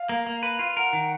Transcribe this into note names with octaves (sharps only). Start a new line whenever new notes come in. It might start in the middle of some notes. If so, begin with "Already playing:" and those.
Already playing: F5
A#3
A#3
B4
F4
A#4 F#5
D#3